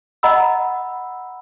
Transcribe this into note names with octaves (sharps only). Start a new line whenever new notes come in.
D#5 F#5 A#5 B5 E6